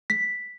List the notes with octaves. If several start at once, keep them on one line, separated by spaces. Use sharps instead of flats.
B6